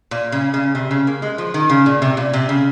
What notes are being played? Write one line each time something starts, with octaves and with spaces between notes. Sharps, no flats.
A#2
C#3
C#3
C3
C#3
A#3
G#3
F3
D#3
C#3
A#2
C3
A#2
C3
C#3